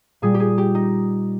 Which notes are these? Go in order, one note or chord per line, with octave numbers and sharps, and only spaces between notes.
A#2 G3 G#4
G4
G#4
G4
D#4